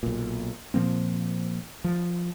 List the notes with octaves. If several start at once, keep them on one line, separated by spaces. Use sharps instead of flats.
B1 A#2
A#2 F3 A#3 C4
F3